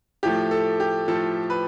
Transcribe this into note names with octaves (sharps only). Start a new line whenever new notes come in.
A2 F3 A3 G4
A4
G4
A2 F3 A3 A4
B4